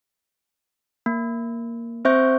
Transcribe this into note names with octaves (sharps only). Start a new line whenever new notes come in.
A#3
C4 C5 E5 C#6 G6